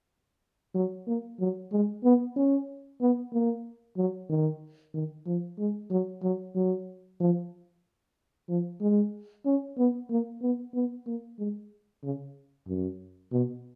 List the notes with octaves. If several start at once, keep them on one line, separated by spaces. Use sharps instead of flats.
F#3
A#3
F#3
G#3
B3
C#4
B3
A#3
F#3
D#3
D#3
F3
G#3
F#3
F#3
F#3
F3
F3
G#3
C#4
B3
A#3
B3
B3
A#3
G#3
C#3
F#2
B2